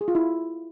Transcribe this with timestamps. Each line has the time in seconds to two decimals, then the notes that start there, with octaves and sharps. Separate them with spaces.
0.01 G#4
0.08 F4
0.15 E4